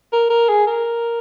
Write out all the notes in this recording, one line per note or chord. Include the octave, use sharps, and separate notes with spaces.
A#4
A#4
G#4
A#4